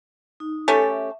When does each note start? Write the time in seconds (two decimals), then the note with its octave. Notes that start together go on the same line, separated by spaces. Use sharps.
0.40 D#4
0.68 A3 C#4 G4 A4 G#5
0.82 E5